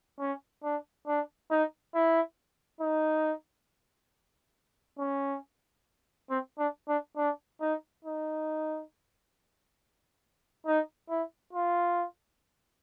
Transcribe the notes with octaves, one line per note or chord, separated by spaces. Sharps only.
C#4
D4
D4
D#4
E4
D#4
C#4
C4
D4
D4
D4
D#4
D#4
D#4
E4
F4